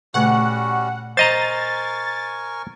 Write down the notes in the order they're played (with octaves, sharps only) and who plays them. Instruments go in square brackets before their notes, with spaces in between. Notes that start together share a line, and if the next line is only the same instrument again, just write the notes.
[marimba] A#2 C#3 A3 [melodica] G3 C#4 F#4 [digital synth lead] F#5
[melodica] A#4 G#5 C#6 [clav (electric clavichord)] C5 D#5 A#5 [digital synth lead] A6